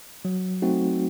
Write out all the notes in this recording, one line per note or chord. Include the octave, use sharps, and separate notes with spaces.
F#3
A3 C4 D#4 F#4